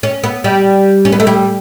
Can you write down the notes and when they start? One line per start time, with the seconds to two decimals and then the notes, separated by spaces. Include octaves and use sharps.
0.03 C#4
0.24 B3
0.44 G3
1.05 C#4
1.12 B3
1.20 A3
1.27 G3